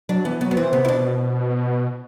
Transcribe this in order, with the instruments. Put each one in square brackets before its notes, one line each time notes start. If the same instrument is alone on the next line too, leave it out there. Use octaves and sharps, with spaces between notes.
[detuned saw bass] F#3 [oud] D4
[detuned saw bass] E3 [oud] B3
[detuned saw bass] F#3 [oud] B3
[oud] B3
[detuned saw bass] E3 [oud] C4
[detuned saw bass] C3 [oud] B3
[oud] E4
[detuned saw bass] B2 [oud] D4